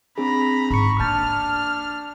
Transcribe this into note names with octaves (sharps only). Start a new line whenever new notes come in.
C4 D4 G#4 A#5 B5
G#2 A#5 B5 C#6 C#7
A#3 D4 A5 F6 G6 A6